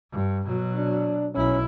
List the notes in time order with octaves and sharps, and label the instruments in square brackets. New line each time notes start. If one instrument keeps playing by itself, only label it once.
[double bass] G2
B2 F#3
[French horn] D4
[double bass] B1 E4 [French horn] C#4